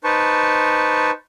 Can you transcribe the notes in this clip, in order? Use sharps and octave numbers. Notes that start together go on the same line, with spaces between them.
D#4 B4 C5 A5 C#6